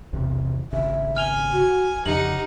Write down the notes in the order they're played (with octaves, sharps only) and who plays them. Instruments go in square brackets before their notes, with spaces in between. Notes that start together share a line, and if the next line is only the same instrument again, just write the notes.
[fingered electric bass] B1 E2 C3
[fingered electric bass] G#1 C#3 [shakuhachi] E5
[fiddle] G#5 [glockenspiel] F6 F7 G7
[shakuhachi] F#4
[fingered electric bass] F2 C#3 [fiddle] D#4 F#5 [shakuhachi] G4 [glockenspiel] F#7